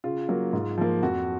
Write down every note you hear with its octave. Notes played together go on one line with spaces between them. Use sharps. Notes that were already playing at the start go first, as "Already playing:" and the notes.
C#3 F4
F#3 A#3
G#2
F3 A#3
F2 F#4